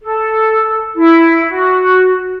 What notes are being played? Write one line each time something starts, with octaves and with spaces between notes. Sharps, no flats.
A4
E4
F#4